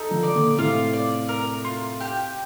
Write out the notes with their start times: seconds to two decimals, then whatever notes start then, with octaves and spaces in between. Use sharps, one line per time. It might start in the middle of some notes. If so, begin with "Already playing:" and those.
Already playing: D#4 A4
0.11 D3 F3
0.23 D5
0.34 A#2 D3
0.58 A2 C3 F4
0.93 D5
1.29 A#4
1.65 F4
2.00 G4